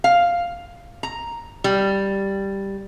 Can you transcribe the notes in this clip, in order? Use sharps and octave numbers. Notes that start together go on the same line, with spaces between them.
F5
A#5
G3